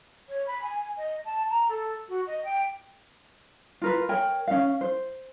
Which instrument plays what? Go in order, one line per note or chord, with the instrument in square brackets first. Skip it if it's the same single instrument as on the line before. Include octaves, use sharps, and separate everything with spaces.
[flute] C#5
B5
G#5
D#5
A5
A#5
A4
F#4
D#5
G5
[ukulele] F4 A#4 B4
A#4 C#5 G5
C#4 F5
C5